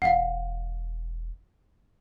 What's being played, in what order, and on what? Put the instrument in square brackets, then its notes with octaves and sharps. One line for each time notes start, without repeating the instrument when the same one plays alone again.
[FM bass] E1 [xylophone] F5 F#5